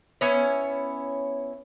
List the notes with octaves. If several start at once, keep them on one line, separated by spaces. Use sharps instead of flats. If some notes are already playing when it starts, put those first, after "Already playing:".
B3 C#4 E4 C#5